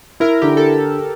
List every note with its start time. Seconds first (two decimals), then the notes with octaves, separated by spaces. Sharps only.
0.20 E4 A#4
0.42 D3 G4
0.57 A4